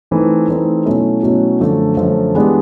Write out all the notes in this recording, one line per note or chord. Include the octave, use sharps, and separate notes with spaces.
E3 A3 C4 D#4
E3 A3 C4 D#4
B2 F#3 A3 C#4 E4
B2 F#3 A3 C#4 E4
F#2 D3 F3 A3
F#2 D3 F3 A3
E3 G#3 B3 D4 G4